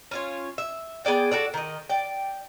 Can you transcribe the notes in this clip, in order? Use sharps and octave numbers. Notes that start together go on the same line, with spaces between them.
C#4 F4 C#5
E5
B3 G#4 D5 G5
F#4 A4 D5
D#3 D#5
D5 G5